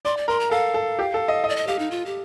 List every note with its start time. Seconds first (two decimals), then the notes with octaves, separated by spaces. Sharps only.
0.05 D5 C6
0.17 D5
0.28 A#4 C6
0.40 A#5
0.51 A4 F5
0.74 A4
0.99 G4
1.14 A4
1.28 D#5
1.44 D#5
1.49 D5
1.56 D#5
1.67 G4 F5
1.79 D#4
1.91 F4
2.06 G4